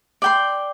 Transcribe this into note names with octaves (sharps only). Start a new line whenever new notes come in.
D5 G5 C6